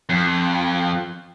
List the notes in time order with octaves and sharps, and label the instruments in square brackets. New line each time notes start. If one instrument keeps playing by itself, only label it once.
[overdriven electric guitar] F2